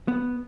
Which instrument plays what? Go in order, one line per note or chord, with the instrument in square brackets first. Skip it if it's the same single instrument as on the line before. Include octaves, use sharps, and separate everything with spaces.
[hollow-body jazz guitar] B3